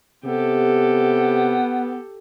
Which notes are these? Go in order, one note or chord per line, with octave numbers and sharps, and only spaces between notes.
C3 B3 G4 A4